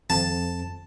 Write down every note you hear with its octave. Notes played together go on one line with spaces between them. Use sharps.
F2 A5